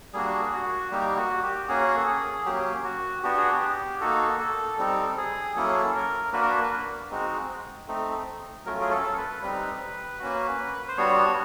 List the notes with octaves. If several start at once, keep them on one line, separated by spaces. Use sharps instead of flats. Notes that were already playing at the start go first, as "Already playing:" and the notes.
G3 A#3 D4 F#4 G#4
F#4
G3 A#3 D#4 G4
F#4
G4
A#3 C#4 F#4 G#4
A4
G#4
F#3 A#3 C#4 G4
F#4
B3 D4 F#4 G4
G#4
G4
A#3 D#4 F#4 A4
A4
G3 C4 D#4 A4
G#4
F#3 A#3 C#4 E4 A4
A#4
A#3 D4 F#4 B4
A#4
B4
G#3 C4 D#4 F#4
A3 C4 D#4
F#3 A3 C#4 F4 A#4
G#4
A4
B4
G3 C4 D#4 B4
A#3 C#4 F#4
C5
G3 B3 D4 F#4 C#5